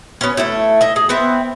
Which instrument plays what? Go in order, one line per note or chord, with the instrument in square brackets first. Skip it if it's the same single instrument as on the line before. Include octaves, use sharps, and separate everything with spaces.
[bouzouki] B3 C#4
A3 E4
D#5 E5
G#4
B3 C4 E5